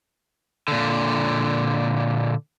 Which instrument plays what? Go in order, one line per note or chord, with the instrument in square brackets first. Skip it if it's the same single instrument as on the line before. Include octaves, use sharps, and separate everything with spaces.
[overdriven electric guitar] A#2 D3